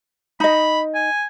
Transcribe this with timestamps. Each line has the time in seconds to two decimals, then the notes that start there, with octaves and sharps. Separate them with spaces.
0.40 D#4 D#5 B5
0.95 G#5